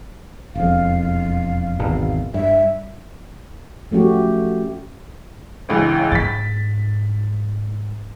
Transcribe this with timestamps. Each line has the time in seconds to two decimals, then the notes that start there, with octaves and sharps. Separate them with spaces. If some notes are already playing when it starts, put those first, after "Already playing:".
0.55 E1 F2 F5
1.79 G#1 E2 B2
2.34 G2 E5
3.91 F3 A3 C#4 F#4 G4
5.69 G1 C#2 E3
6.12 G#2 A6 B6